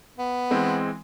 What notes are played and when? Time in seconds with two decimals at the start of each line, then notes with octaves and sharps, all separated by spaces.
0.18 B3
0.50 E3 G#3 C4